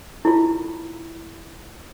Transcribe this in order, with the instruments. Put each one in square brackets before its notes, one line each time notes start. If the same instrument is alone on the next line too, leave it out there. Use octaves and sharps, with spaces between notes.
[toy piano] E4 F4